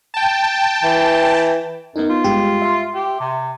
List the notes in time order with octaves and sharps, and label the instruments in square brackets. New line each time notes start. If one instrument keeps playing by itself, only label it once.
[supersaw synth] G5 A5
[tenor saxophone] E3
[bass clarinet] F#2 [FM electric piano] B3 D#4
[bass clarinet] F4
[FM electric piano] G2 G#3 G4
E5 C6
[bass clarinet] G4
C3